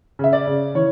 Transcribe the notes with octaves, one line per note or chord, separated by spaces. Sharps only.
C#3 E5
D5
C#3
E3 C#5